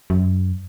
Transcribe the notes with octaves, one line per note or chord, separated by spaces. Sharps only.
F#2